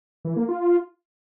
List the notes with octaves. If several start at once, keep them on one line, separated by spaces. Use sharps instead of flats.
E3
A#3
F4